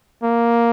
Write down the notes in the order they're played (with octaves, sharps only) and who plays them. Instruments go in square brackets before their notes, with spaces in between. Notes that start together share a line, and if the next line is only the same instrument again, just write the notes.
[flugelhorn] A#3